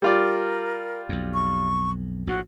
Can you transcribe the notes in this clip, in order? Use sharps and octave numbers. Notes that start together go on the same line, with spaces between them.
G3 F4 A#4 D5
B1 F2
C#6
A#1 A2 F#4